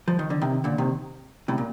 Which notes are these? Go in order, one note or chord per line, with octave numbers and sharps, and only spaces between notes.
F3
D#3
D3
C3 D#3
A#2 D3
C3 D#3
A2 C3
A#2